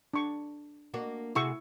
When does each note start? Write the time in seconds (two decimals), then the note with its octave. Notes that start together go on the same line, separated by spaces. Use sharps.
0.14 D4 C#6
0.94 A#3 D4 F#4
1.35 C3 E4 F#4 G#4 C#6 E6